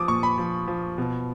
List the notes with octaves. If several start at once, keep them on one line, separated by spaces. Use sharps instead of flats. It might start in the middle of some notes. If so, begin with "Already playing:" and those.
Already playing: F3 D6 D#6
A#2 C#6
B5
F3
F3
B2